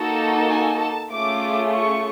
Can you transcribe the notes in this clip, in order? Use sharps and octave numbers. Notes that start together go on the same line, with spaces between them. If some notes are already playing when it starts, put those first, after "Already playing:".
Already playing: A#3 D#4 F#4 A4
G#5
A5
A3 C#4 F4 G#4 D6
C#6